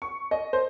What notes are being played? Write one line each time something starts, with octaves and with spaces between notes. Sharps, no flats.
C#6
D#5
C5